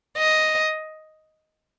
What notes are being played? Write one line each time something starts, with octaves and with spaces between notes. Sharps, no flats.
D#5